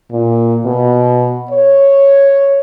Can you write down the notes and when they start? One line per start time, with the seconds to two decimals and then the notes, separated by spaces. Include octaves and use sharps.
0.11 A#2
0.66 B2
1.51 C#5